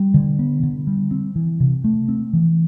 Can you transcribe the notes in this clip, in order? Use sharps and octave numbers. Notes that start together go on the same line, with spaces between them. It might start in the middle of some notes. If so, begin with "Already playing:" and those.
Already playing: G3
D3
B3
D3
G3
C4
E3
C3
A3
C4
E3